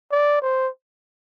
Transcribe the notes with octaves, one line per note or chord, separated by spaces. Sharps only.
D5
C5